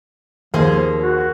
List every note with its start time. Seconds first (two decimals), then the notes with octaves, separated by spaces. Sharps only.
0.54 D#2 F3 A#3 G#4 C5
1.00 F#4